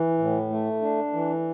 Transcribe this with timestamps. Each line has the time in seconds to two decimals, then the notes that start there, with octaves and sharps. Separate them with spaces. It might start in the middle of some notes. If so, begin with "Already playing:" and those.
Already playing: E3
0.18 A2
0.50 A3
0.81 D4
1.13 E3